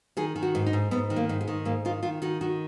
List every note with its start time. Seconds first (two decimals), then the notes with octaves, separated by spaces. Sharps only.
0.17 D#3 G#4
0.36 D#3
0.43 F#4
0.55 G#2
0.66 D#4
0.73 G#2
0.91 G#2 B3
1.10 D#3
1.16 A#3
1.29 G#2
1.41 G#3
1.48 D#3
1.65 G#2 A#3
1.85 D#3 F4
2.03 D#3 F4
2.22 D#3 F#4
2.41 D#3 F#4